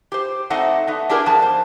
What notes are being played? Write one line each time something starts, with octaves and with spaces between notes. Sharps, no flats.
G4 C5
A3 C4 D#4 C5 D5 F#5
A3 B3 D#4
D4 E4 G4 G#4 A#4 B4
G#2 F3 B3 A5
C5